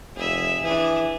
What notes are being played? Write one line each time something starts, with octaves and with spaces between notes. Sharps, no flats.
F1 G#4 E5
E3 D4 G#4